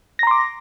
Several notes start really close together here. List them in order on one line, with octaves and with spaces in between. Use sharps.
A#6 A#5 C6 D6